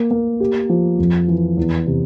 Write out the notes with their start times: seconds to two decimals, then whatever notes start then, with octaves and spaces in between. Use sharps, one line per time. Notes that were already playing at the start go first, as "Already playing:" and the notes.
Already playing: A#3
0.11 A#3
0.40 G4
0.70 F3
0.99 F2
1.28 E3
1.57 E2
1.87 C3